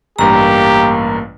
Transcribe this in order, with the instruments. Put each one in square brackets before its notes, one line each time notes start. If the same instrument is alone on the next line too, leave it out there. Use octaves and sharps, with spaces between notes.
[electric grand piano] A1 G2 [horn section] A#3 [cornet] G4 [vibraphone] A#5